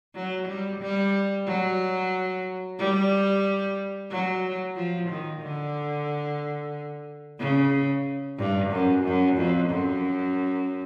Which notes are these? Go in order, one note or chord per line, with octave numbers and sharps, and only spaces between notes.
F#3
G3
G3
F#3
G3
F#3
F3
D#3
D3
C#3
G2
F#2
F#2
F2
F#2